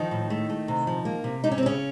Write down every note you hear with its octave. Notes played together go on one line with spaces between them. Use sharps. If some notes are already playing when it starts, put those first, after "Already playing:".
Already playing: D#3 F3 D#4
A2
A3
A3
C3
F3
A#3
C3
C3 D#4
C#4
C4
C3
C#3 C#4